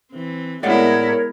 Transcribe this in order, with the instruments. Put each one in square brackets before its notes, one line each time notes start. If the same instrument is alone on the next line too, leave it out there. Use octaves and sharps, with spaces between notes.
[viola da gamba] E3 C4
[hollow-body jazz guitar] A2 D5 F#5 [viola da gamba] G#3 B3 E4 [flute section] A#4 C#5